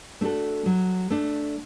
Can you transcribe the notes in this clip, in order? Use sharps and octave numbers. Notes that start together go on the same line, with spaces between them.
A3 D4 F#4 A4
F#3
A3 D4